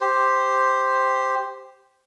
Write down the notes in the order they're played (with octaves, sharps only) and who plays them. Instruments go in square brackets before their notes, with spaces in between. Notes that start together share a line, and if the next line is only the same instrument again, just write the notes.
[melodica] G4 C5